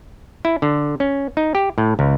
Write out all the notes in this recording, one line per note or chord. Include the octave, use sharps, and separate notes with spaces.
E4
D3
C#4
D#4
G4
A2
C#2